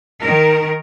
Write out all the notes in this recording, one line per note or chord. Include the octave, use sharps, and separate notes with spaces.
D#3 A#4